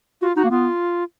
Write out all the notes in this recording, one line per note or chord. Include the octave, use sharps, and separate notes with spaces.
F4 F#4
D#4 F#4
A#3
B3 F4